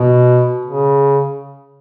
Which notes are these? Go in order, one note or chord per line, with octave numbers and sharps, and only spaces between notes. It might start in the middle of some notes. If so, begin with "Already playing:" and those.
Already playing: B2
C#3